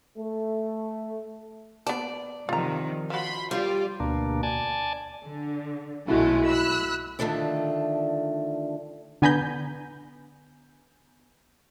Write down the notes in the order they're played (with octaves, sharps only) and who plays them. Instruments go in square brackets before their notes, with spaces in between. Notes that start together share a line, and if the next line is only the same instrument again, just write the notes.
[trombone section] A3
[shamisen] B3 A5 [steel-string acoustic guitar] D5
[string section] C3 D#3 F3 [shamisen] F4 A#5
[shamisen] F3 F#4 [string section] B5 C6
[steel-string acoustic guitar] G3 [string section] F4 D5
[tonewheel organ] D2 B2 A#3 D4
D5 G#5 A5
[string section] D3
[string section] B1 G#3 A3 [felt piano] E4 F#4
[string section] B5 E6 F#6
[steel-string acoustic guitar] D3 D#3 F3 A3 D4
[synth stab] D3 B3 G#5 A#5 B5 G6